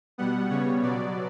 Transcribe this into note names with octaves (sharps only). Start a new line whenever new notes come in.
B2 G3 B3 F#5
C#3 G3 B3 C#5
B2 F#3 B3 D5